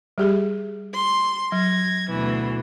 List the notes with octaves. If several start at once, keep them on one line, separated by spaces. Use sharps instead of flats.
G3 G4 G#4
C6
F#3 G#6 A#6
D2 B2 E3